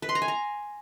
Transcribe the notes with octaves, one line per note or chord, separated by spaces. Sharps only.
B4
C6
A#5
G#5
A#5